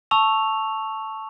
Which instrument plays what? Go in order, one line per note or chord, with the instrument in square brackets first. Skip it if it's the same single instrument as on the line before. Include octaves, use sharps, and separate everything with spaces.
[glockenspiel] A5 C#6 E6 F7